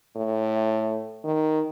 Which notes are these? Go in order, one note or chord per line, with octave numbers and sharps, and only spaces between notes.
A2
D#3